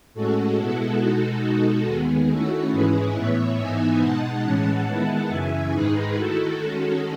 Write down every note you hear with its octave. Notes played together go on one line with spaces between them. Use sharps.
A2 G#3 C#4 F#4 A4
B2 G#3 B3 E4
B2 G#3 D#4
B2 G#3 D#4
D#2 D#3 G#3 B3 G#4
D#3 A3 C#4 E4 F#4 A4
G#2 E3 G#3 C#4 E4 G#4 B4
A2 E3 B3 C#5 E5
G#2 E3 B3 D#4 E5 G#5
B2 G#3 D#4 F#5 A5
A2 E3 G#3 C#4
D#3 G#3 B3 E4
F#2 C#3 E3 E5 G#5
G#2 D#3 G#3 D#4 G#4 B4
D#3 A3 E4 F#4 A4
D#3 G#3 C#4